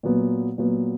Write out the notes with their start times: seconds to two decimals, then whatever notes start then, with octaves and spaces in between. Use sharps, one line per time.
0.03 A#2 F#3 B3
0.58 A#2 F#3 B3